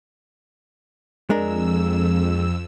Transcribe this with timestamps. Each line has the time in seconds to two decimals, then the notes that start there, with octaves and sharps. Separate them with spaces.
1.30 F2 G#3 D4 A#4 E6